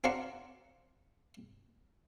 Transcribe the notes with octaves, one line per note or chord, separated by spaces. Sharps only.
C4 D4 F#4 F5 F#5 A#5